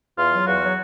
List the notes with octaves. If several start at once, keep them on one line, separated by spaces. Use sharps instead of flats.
E2 F4
F#3
E2 F#4
F#3